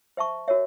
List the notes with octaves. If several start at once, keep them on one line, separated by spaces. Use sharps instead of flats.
C5 E5 A5 C#6
F#4 A#4 C#5 E5